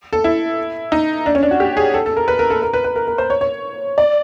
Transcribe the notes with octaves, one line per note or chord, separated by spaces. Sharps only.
A4
E4
D#4
D4
C#4
D4
F#4
G4
G#4
A4
A4
A#4
B4
A#4
A4
A#4
B4
B4
A#4
A#4
C5
C#5
C#5
D5